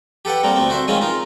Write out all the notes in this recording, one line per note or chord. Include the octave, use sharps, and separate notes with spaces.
G4 A4 B4 F#5 G5
G3 A#3 C4 A#4
D2 A3 C4
F#4 C5 E5
D#3 F3 G#3 C4 C#4 F4
D#4 F4 A#4